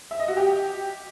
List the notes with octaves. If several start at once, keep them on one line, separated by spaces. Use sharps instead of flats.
E5
D#5
F#4
G4